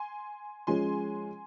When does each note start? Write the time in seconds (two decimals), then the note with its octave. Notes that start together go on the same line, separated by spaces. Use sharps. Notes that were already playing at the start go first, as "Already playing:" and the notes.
Already playing: G#5 C6
0.67 F3 G#3 C#4 G#5 C6